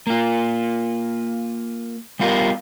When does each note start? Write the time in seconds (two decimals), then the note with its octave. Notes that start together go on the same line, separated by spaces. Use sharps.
0.07 A#3 F4
2.20 G3 B3 F4 G4 A#4